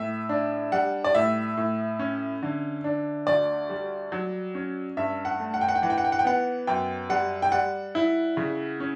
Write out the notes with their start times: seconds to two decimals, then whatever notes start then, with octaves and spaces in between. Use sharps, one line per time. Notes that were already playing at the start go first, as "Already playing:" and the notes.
Already playing: A2 E5
0.29 D4
0.72 G3 F#5
1.04 D5
1.15 A2 E5
1.57 A2
1.99 C#4
2.43 D3
2.84 D4
3.27 D2 D5
3.69 G3
4.12 F#3
4.55 C#4
4.97 G2 E5
5.25 F#5
5.40 A3
5.54 F#5
5.61 G5
5.68 F#5
5.75 G5
5.82 E3 F#5
5.90 G5
5.98 F#5
6.04 G5
6.12 F#5
6.19 G5
6.25 B3 F#5
6.67 F#2 G5
7.09 G3 F#5
7.42 G5
7.52 G3 F#5
7.95 E4
8.37 C#3
8.80 C#4